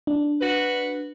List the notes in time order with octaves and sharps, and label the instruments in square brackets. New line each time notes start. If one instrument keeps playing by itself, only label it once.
[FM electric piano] D4
[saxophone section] F#4 B4